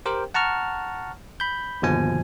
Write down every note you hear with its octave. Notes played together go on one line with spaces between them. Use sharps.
G4 A#4 C5 G5
F#5 A5 A#5 C#6 F6
B5 G6
G1 D#2 B2 F3 G#5